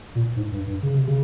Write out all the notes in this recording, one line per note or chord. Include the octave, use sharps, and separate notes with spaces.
A#2
G#2
G2
G2
C#3
C3
C#3